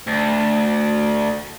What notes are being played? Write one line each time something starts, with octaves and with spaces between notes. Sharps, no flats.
D2